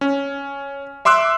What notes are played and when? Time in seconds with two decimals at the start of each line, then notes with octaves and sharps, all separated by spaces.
0.01 C#4
1.05 E5 C6 D6 E6 F#6